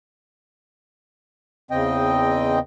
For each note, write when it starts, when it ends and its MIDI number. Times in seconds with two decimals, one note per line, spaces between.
1.71 2.59 40
1.71 2.59 49
1.71 2.59 60
1.71 2.59 75
1.71 2.59 79